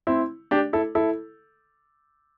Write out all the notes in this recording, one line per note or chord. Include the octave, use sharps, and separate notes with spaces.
C4 E4
D4 G4
E4 A4
E4 A4